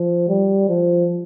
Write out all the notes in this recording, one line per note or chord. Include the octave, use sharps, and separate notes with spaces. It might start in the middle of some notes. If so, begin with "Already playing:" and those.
Already playing: F3
G3
F3